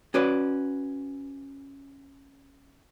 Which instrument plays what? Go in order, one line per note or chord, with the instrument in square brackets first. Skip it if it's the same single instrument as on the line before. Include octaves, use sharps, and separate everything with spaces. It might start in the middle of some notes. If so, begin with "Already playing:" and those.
[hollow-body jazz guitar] C#4 F#4 B4 D5